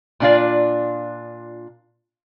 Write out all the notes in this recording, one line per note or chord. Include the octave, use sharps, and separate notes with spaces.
A#2 D4 F4 D5